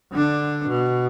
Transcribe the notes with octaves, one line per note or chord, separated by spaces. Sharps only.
D3 D4
B2